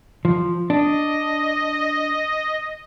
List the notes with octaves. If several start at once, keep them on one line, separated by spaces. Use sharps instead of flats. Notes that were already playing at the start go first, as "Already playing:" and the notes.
F3
D4 D#5